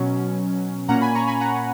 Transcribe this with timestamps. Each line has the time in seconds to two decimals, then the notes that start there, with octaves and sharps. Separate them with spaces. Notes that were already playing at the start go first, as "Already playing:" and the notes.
Already playing: B2 F#3 C#4
0.88 A#2 A#3 C#4 F#5 A#5
1.01 G#5 B5
1.15 A#5 C#6
1.27 G#5 B5
1.41 F#5 A#5